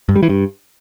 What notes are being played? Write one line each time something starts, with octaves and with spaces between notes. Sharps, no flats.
G2
G3
E3
G2